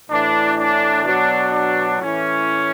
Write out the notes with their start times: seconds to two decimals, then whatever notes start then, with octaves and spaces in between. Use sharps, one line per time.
0.10 A2 E3 D4
0.57 D4
1.04 B2 F#3 D4
1.52 D4
1.99 A2 E3 C#4